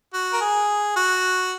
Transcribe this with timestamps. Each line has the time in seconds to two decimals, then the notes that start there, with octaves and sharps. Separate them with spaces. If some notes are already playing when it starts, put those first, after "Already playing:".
0.14 F#4
0.33 A#4
0.41 G#4
0.96 F#4